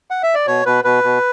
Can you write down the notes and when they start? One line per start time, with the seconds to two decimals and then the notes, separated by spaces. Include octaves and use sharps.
0.10 F#5
0.23 E5
0.34 D5
0.47 B2 C#5
0.66 B2 B4
0.84 B2 B4
1.04 B2